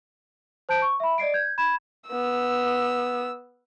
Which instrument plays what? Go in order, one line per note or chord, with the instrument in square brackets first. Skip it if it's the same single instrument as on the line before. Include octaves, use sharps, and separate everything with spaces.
[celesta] C5 A5 G6 D7
C#6
E5 B5
D5 D#5 C7 D7
G6 G#6
B5 G#6 E7
[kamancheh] B3 E6